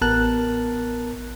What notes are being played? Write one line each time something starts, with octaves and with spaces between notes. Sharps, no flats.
A1 B3 A#4 A5 F#6